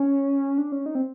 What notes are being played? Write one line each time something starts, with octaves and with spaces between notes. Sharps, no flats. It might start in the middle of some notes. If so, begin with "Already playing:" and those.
Already playing: C#4
D4
C#4
D#4
C4